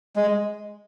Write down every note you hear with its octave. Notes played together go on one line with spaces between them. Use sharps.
G#3